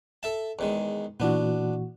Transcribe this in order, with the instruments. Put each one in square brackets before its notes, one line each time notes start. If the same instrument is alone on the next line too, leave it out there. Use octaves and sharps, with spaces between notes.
[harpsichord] A4 E5 A5
E2 D#3 G#3
[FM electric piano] A#2 E3 F#4 [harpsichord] B3 D4